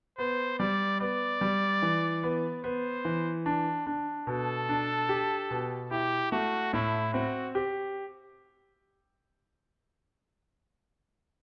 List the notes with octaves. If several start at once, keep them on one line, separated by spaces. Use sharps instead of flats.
B3 C5
G3 D5
B3 D5
G3
E3
B3
B3 C5
E3
D4
D4
B2 A4
D4
G4
B2
E4 G4
A3 F#4
A2 E4
C4 F#4
G4